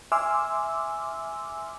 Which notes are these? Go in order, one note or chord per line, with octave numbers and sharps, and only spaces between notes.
E5 G#5 C6 D6 E6 F6